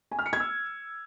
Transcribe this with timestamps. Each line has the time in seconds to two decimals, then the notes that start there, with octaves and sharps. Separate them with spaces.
0.11 G#5
0.19 F6
0.26 C#7
0.33 G#6
0.40 E6